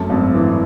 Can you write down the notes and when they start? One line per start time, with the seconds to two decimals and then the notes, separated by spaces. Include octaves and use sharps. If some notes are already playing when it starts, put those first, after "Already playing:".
Already playing: F#2 A3 A5
0.10 G#1
0.34 E3